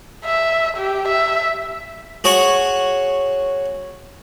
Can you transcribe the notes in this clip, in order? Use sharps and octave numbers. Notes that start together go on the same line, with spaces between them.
E5
G4
E5
F#4 G#4 C#5 F#5